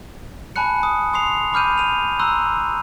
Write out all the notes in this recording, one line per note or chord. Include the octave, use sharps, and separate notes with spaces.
G#5 A5 B5 F#6 C#7
D#6
C6 D#6 C7 F7
B5 D6 F6 G6 D#7
D#7 F7
A#5 C6 E6 F#6